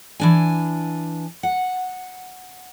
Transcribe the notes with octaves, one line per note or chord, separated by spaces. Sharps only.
E3 D4 G#5
F#5